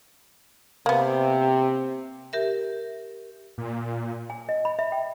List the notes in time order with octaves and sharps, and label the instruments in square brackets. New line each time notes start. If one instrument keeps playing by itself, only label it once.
[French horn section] C3 [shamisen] A#3 B3
[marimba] G4 A#4 E5
[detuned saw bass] A#2
[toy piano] G#5
D#5
B5
E5
G5